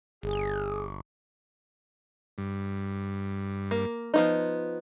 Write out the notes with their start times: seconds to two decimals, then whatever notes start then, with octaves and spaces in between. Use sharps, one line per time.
0.23 G1 G#4
2.38 G2
3.71 A#3
4.14 F3 B3 D#4